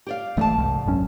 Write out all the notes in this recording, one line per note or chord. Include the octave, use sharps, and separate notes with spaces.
G4 D5 F5
F#1 D2 G#2 E3 A3 A5
C2
G#1 F#2 C#4